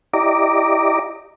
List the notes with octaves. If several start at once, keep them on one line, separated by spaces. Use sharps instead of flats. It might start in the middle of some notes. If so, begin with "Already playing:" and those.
E4 G4 D5 D#5 A#5 D6